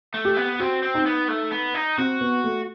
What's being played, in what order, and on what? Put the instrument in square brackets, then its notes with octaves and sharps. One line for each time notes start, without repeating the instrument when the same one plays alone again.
[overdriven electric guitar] A3
[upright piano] G4
[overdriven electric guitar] B3
[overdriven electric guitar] C4 [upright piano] F#4
[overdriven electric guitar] C4
[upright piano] D#4
[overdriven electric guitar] B3
A3
B3
D#4
[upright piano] C4 [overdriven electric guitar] F#4
[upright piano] B3
A3